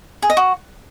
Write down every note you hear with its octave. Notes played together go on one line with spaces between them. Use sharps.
G#4
D#5
F#4